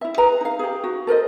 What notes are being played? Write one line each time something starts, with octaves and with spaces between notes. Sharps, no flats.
E4 E5
G#4 B4 A#5
D#4 F5
G4 G#4
F#4
A4 A#4 C5 D#5